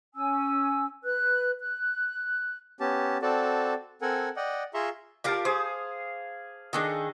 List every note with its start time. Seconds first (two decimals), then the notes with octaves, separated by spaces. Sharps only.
0.14 C#4 G#5 E6
1.04 B4 F#6
1.60 F#6
2.80 B3 C#4 G4 A5
3.22 C4 F#4 A4 D5 A5
4.02 C4 A4 A#4 F#5 G#5
4.36 D5 D#5 F#5 G5
4.74 F4 G#4 E5 A#5 C6 C#6
5.24 F4 G4 A#4 D5 F5 A5
5.45 G#4 C5 F5 D#6
6.73 D#3 D4 D#4 G#4 A4 D#5